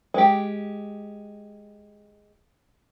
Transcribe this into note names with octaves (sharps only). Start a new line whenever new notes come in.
G#3 G4